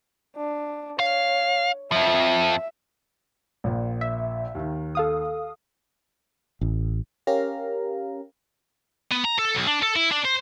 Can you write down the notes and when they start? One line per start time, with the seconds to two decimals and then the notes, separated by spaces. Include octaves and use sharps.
0.37 D4
1.00 C#5 F5
1.92 F2 F3 E5
3.64 A#1 A#2
4.01 E5
4.55 D#2 D#3
4.95 A4 F5 D#6
6.61 A1
7.27 C#4 G4 A#4 F5 A#5
9.12 B3
9.25 A#5
9.39 A4
9.55 B1
9.67 D4
9.83 A4
9.96 E4
10.12 D4
10.25 C5